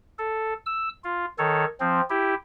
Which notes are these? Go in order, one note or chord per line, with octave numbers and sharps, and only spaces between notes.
A4
E6
F4
D#3 A4 C#5
F3 C4
E4 G4